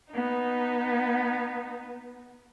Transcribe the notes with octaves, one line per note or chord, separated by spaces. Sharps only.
B3 D#4